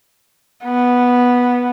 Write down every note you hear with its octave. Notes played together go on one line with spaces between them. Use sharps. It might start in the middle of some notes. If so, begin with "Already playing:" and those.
B3